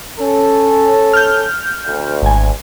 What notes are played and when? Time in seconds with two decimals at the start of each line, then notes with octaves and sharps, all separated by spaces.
0.20 C#4 A4
1.13 F6 G6
1.85 D2
2.22 G#1 G#5